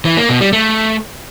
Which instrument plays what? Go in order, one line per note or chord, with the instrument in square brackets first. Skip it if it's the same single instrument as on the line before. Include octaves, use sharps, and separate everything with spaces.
[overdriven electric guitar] E3
A#3
B2
G3
A3